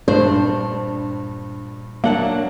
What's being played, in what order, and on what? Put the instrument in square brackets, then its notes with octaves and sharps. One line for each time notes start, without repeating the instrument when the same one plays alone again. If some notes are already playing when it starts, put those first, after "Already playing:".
[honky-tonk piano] G2 [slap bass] A#2 G3 [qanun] D4 [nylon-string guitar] C5
[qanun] F#3 F#5 A5 [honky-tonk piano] A#3 D4